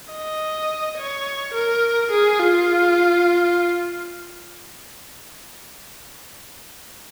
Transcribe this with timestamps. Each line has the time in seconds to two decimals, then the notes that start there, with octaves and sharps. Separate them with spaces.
0.13 D#5
0.98 C#5
1.54 A#4
2.11 G#4
2.39 F4